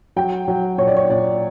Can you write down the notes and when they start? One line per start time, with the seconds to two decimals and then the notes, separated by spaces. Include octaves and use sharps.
0.16 F#3 G5
0.48 F#3
0.78 A#2 C#5
0.87 D5
0.97 C#5
1.09 A#2 D5